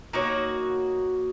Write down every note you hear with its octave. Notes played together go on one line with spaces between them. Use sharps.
A#3 D#4 F#4 C#5